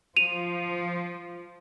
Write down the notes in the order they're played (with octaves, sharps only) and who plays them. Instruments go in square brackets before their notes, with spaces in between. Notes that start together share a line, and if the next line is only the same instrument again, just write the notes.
[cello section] F3 [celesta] D#7 F7